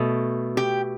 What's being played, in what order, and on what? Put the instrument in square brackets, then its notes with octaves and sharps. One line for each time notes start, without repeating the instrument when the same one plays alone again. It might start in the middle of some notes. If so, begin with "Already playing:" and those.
Already playing: [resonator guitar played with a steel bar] B2 A3
G4